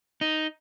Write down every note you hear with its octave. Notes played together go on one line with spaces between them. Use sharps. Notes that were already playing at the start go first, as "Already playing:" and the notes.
D#4